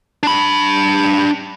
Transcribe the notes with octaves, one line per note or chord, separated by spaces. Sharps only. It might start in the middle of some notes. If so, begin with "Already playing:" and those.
D4 B5